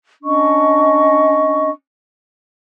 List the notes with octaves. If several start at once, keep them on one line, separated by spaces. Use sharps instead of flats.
C#4 D4 D#5 C#6